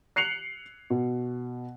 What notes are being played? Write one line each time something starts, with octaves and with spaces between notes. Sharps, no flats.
F#6 C7 C#7 F7 F#7
B2